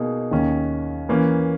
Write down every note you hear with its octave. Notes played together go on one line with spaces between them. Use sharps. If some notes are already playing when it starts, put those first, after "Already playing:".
Already playing: B2 A#3 D#4 G#4
D#2 D#3 A#3 C#4
E3 A#3 C#4